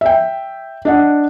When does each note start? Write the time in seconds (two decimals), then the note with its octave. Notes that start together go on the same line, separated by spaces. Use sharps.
0.01 E5 G5
0.85 D4 D#5 F#5